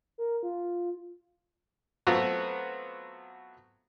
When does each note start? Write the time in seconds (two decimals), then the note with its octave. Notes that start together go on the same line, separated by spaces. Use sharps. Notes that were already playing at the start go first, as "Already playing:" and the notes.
0.18 A#4
0.43 F4
2.07 F#3 A3 B3 C4 F4 F#4